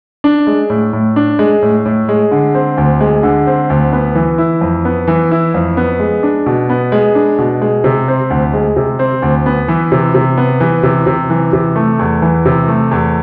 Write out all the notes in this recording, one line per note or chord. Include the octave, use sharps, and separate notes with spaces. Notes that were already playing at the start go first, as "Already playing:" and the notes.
D4
G#3
A2
A2
D4
G#3
A2
A2
G#3
D3
C4
D2
G#3
D3
C4
D2
B3
E3
E4
F2
B3
E3
E4
F2
B3
G#3
D4
B2
B3
G#3
D4
B2
G#3
C3
C4
D2
G#3
C3
C4
D2
B3
E3
C3
C3
B3
E3
C3
C3
E3
C3
A3
E2
E3
C3
A3
E2